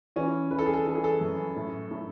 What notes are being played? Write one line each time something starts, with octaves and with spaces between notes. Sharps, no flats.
E3 C#4
E3 B4
A4
G#4
A4
E3 A4
G#4
A4
F#2
A2
A2